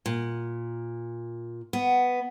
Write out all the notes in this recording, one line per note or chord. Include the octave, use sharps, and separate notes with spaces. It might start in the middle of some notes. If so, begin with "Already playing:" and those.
A#2
B3